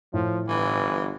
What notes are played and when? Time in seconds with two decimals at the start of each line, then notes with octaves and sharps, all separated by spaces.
0.13 A2 F3
0.48 G1 E3